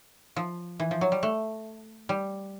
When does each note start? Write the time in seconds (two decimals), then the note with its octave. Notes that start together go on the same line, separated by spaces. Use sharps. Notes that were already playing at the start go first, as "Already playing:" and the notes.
0.36 F3
0.80 E3
0.91 F3
1.01 F#3
1.12 G3
1.23 A3
2.09 G3